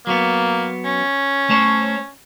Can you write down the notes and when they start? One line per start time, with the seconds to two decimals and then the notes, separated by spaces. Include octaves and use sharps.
0.07 F#3 A#3 B3
0.85 C#4
1.50 A3 C5 C#5